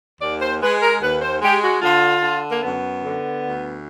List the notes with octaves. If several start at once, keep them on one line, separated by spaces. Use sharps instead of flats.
D#2 D5
C5
G#3 B4
A#4
D#2 B4
C5
G#3 G4
F#4
D3 F4
D3
A#3
F#2 B3
D3
D2